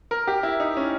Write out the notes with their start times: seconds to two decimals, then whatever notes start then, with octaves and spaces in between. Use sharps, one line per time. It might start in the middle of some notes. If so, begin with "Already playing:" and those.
0.11 A#4
0.27 G4
0.43 E4
0.60 D#4
0.77 C#4